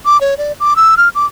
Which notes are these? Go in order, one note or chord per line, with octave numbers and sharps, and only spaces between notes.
D6
C#5
D5
D6
E6
F6
D6